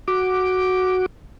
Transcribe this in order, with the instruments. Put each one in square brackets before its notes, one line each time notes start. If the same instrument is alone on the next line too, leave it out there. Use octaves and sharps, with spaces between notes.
[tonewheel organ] F#4 D6